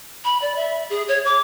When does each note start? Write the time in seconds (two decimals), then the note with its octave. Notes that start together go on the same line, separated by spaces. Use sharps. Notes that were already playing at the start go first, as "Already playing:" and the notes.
0.25 B5
0.42 D5
0.56 E5
0.90 G#4
1.08 C#5
1.25 D6